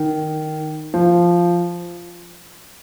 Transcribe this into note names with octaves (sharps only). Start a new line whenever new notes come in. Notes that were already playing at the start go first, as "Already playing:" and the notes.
Already playing: D#3
F3